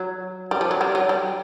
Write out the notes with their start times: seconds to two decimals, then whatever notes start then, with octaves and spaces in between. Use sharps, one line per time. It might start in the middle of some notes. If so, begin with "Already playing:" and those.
Already playing: F#3
0.51 G3
0.61 F3
0.71 F#3
0.81 G3
0.95 F#3
1.09 G3